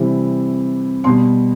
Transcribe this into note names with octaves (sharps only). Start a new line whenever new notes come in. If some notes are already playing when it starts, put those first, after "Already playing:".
Already playing: C3 E3 G3
B2 G3 C6